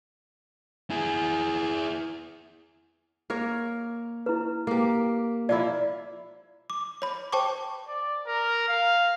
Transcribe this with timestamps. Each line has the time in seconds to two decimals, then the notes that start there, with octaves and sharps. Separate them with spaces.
0.90 E4 G#4
3.30 A#3 A#4 C#5
4.26 E4 B4
4.67 A#3 G4
5.49 F3 A#3 E4 D5
6.70 D6
7.02 C#5 B5
7.32 C5 G5 A5 C#6 D6
7.87 D5
8.26 A#4
8.68 F5